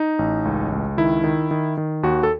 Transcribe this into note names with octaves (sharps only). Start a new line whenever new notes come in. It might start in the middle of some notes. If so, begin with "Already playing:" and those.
Already playing: D#4
A1
C#2
C#2
D#3 E4
D#3
D#3
D#3
D#2 F#4
A4